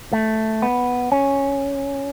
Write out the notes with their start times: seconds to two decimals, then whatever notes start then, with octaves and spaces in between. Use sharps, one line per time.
0.13 A3
0.62 B3
1.12 C#4